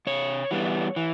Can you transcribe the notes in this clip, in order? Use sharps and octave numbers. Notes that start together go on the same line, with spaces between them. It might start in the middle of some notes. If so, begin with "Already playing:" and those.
C3 C#5
E3 G3 B3
E3